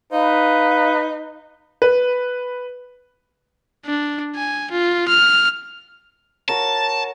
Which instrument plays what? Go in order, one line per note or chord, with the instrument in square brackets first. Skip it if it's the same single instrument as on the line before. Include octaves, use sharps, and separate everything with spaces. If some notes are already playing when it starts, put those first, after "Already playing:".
[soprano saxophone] D#4 [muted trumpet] B4 [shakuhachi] F5
[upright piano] B4
[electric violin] D4
G#5
F4
F6
[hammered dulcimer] F#4 A#4 C#5 [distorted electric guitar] A5